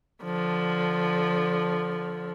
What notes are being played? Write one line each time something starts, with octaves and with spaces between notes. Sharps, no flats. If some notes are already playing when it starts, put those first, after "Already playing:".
D3 F3